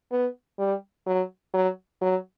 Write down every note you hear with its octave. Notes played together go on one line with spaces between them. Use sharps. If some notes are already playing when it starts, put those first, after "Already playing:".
B3
G3
F#3
F#3
F#3